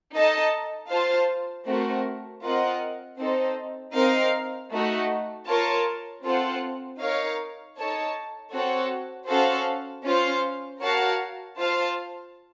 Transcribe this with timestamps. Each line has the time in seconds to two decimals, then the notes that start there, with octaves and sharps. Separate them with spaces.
0.13 D#4 A4 D#5 A5
0.89 F4 C5 F5 A5
1.66 A3 C4 F#4 A#4
2.43 C4 F4 A#4 D#5 F#5
3.18 C4 D#4 A4 C5
3.94 C4 D#4 A#4 F5
4.71 A3 D#4 F#4
5.47 F4 A#4 C#5 A5
6.24 C4 F4 A4 C5 F#5
7.00 D#4 A#4 C#5 F5
7.77 D#4 A4 C#5 A5
8.53 C4 F#4 A4 C#5
9.29 C#4 F#4 A4 C5 F5
10.05 C#4 F4 C5 F5
10.81 F#4 A#4 C#5 F5 A5
11.58 F4 C5 F5 A5